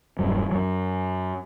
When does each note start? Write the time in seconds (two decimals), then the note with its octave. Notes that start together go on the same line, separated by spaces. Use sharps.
0.19 E1 G2 F#3
0.52 F#2 F#3